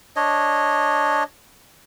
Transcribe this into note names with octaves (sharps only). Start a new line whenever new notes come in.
D4 C#5 D#5